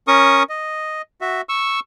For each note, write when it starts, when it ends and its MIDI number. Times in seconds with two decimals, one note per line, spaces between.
0.08 0.43 61
0.08 0.43 70
0.08 0.43 85
0.08 0.43 87
0.49 1.02 75
1.21 1.41 66
1.21 1.41 76
1.49 1.80 85
1.49 1.80 88